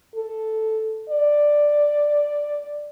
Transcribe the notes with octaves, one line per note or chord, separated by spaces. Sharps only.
A4
D5